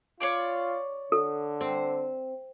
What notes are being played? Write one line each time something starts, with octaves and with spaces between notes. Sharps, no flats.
F4 C#5 D5 D6
D3 A4
C4